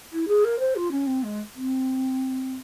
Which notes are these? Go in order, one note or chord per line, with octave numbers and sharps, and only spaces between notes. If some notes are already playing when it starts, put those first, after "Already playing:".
E4
G#4
A#4
C5
F4
C#4
C4
G#3
C4